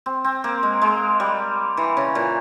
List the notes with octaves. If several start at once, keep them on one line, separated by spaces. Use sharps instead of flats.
C4
C4
A#3
G#3
G#3
G3
E3
C#3
A#2